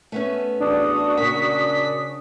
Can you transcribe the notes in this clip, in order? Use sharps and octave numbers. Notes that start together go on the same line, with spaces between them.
A3 B3 C#4
A1 E2 D4 F#4 D#6
A#2 C#3 C#4 D4 A#4 B6